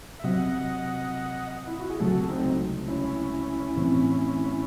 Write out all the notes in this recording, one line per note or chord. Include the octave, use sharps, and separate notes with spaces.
E5
C3 F#3 C4 D#5 F#5
E4
F#4
G#4
C#2 C3 F#3 A3 F#4 A4
C4 D#4
C#4 E4
A2 E3 C4